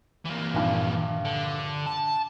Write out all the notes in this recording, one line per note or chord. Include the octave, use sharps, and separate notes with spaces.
E3 A#3
A#1 G2
D3
A5